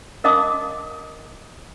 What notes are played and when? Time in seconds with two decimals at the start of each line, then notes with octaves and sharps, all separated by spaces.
0.24 A#4 D#5 F5 A5 D6 D#6